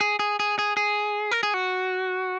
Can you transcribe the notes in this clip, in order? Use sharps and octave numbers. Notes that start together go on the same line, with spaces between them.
G#4
G#4
G#4
G#4
G#4
A#4
G#4
F#4